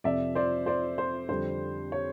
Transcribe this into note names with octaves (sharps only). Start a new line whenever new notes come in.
F2 C3 F3 D5 E5
C5 D5
C5 D5
C5
F2 D3 G3 C5
C#5